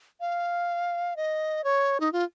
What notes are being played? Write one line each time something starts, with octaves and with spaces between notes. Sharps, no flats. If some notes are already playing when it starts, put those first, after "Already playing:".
F5
D#5
C#5
D#4
F4